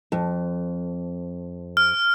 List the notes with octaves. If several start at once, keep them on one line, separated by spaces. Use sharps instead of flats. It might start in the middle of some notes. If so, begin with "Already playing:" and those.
F2
F6